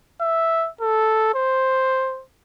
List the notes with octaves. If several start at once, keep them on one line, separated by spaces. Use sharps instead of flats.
E5
A4
C5